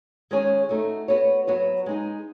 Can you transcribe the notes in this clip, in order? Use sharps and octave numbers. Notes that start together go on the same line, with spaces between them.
D#3 G#3 C#4 G#4 C#5
A3 D#4 F#4
B3 F#4 C#5
F#3 B3 F#4 C#5
G#3 D#4 G#4